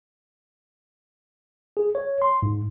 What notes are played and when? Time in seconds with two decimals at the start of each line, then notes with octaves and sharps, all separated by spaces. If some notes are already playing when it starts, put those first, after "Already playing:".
1.77 G#4
1.95 C#5
2.22 C6
2.43 G#2